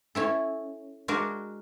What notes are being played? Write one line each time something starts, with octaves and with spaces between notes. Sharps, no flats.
C#4 E4 A4
G#3 D4 F#4 A#4